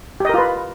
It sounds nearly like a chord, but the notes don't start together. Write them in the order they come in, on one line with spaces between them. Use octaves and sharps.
G4 D#5 A#4 F4 B4